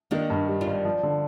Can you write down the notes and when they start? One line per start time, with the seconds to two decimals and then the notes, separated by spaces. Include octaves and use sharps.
0.11 D#3 A#3 D4
0.30 G2
0.48 G3
0.61 D4 F4
0.67 G#1
0.85 F3
1.03 D3